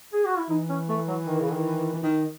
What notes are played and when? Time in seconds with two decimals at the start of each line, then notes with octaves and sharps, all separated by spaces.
0.13 G#4
0.25 F#4
0.38 E4
0.49 E3 D#4
0.69 C#4
0.89 A3
1.08 F#3
1.26 D#3
1.40 C#3
1.52 D#3
1.94 E3
2.03 D#3